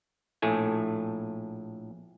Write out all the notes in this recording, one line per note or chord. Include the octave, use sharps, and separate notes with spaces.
A#1 A2 A3 G#5